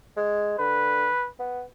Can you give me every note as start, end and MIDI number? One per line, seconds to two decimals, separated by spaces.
0.17 0.58 56
0.59 1.07 50
0.59 1.27 71
1.39 1.63 59